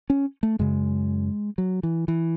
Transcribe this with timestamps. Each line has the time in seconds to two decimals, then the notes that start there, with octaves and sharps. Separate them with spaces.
0.10 C#4
0.43 A3
0.59 F#2 C#3 G#3
1.58 F#3
1.83 E3
2.08 E3